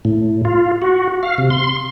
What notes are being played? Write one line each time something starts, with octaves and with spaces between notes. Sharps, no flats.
A2
F4
F#4
F5
C3
C6